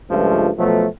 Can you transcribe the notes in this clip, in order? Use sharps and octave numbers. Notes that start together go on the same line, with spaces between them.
C#2 G2 F3 G#3 A3
B2 F3 F#3 A3